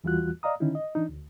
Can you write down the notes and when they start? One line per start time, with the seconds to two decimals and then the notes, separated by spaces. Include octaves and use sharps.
0.04 E2 E3 G3 F4 F#4 F#6
0.43 D5 D#5 F5 A#5 D#6
0.60 D3 D#3 C#4 D#4 E4
0.75 D#5
0.95 E3 D4 D#4
1.09 D2